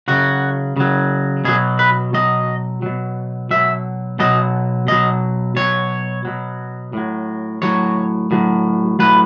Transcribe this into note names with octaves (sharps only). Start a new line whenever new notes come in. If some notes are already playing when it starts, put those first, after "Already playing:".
C#3 F#3 F#4
C#3 F#3
B2 F#3 G#4
B4
B2 F#3 D#5
B2 F#3
B2 F#3 E5
B2 F#3 D#5
B2 F#3 D#5
B2 F#3 C#5
B2 F#3
A2 F#3
A2 F#3 C#5
A2 F#3
A2 F#3 B4